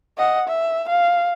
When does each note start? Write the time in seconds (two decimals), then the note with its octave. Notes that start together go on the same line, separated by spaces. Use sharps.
0.17 D#5 F#5
0.47 E5
0.89 F5